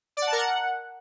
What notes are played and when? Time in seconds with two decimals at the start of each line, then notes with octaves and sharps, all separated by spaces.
0.17 D5
0.22 F#5
0.27 A5
0.32 A#4
0.38 F#5